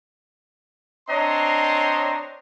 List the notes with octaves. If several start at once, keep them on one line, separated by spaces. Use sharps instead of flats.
C4 D4 C#5 D#5 A#5 C6